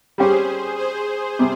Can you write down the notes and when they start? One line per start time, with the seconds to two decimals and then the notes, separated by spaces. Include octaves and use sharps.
0.18 G3 C#4 G4 G#4 C5
0.79 G#4 C5
1.39 C3 G3